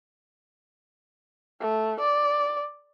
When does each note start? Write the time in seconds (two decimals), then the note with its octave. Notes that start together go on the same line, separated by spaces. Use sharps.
1.60 A3
2.00 D5